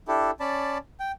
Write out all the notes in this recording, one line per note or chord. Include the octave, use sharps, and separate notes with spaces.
D4 E4 G4 A4
C#4 D5 A5 B5
G5